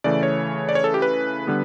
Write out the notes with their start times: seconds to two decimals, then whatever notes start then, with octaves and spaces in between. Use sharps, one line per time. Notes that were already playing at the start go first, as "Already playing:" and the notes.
0.04 C#3 E3 A3 D5
0.23 C#5
0.69 D5
0.75 C#5
0.84 A4
0.94 G4
1.02 B4
1.47 D3 G3 B3